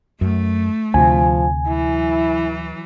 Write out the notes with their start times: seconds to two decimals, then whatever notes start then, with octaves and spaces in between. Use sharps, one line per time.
0.21 F#2 A3
0.94 D2 C3 F3 G#5
1.67 E3 F#3 E4